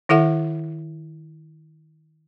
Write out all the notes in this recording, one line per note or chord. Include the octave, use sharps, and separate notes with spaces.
D#3 E4 A4 E5 F#5